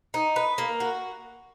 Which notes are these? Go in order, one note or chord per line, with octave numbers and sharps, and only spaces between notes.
D#4
B4
A#3
F#4